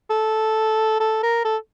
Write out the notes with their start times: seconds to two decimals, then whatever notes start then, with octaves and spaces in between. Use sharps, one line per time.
0.10 A4
1.00 A4
1.23 A#4
1.45 A4